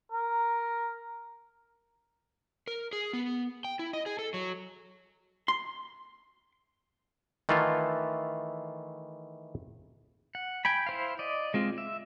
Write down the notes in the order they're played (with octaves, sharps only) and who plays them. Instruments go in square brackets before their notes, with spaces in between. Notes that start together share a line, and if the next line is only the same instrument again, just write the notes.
[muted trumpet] A#4
[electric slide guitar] A#4
G#4
B3
G5
E4
D#5
G#4
A4
F#3
[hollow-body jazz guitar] C6
[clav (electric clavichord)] D#3 E3 A3 F4 A4
[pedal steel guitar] F#5
G5 G#5 B5
E4 C5 F5
D5 D#5
G#3 C4 F4
E5